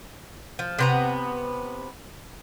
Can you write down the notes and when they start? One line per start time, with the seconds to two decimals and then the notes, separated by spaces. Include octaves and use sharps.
0.59 F3
0.79 C3 B3 A#5